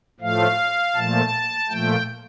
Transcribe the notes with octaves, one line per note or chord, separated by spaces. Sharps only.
A2 F3 A3 F5
A#2 F3 A3 A5
A#2 F3 A3 G5